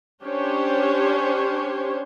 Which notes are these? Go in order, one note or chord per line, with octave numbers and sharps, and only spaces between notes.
C#4 D4 G4 C5 C#5